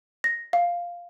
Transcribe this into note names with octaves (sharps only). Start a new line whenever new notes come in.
A#6
F5